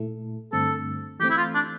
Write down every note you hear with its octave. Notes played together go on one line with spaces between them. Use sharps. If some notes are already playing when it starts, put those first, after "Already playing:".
Already playing: A#2 A3 E4 A4
G2 D3 A3 C4 A4
E3 A3 C4 G4
E4
F4
D4